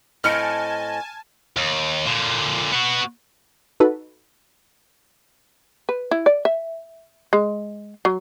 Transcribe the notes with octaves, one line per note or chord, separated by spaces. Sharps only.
A2 C4 D#5 G#5 A5 F6 C#7 D7
D#2
A#2 D3
B3 F#4
D#4 F#4 A4 B4
B4
E4
D5
E5
G#3
F#3